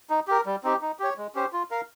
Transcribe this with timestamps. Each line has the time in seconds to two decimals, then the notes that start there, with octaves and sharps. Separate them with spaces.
0.10 D#4
0.27 G4 A#4
0.46 G3
0.64 C4 D#4 G4
0.81 D#4
0.99 G4 C#5
1.17 G#3
1.35 C#4 G4 C5
1.53 F4
1.71 A#4 F5